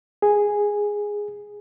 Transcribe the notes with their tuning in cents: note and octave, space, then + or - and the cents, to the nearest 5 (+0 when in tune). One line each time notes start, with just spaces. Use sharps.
G#4 -5